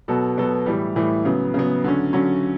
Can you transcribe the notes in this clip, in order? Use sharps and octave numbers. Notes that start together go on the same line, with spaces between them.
B2 F#3 B3 F#4 A4
B2 F#3 B3 F#4 A4
A2 E3 G3
A2 E3 G3
C#3 F#3 B3
C#3 F#3 B3
D3 F#3 C#4
D3 F#3 C#4